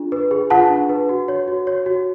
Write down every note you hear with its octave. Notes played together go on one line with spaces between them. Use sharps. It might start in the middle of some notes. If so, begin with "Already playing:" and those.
Already playing: D4 F4 G#4
B4
G#4
F4 F#5 A5
D4
B4
F#4
C#5
F#4
C#5
F#4